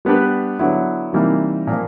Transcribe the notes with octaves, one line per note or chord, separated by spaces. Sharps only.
G3 B3 D4 G4 B4
D3 F#3 B3 E4
C3 E3 G3 A#3 D#4
A#2 F3 A#3